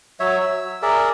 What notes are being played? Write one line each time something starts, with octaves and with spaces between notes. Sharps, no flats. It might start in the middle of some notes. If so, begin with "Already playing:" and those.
F#3 C#5 E5
E6
G#4 A#4 D5 E5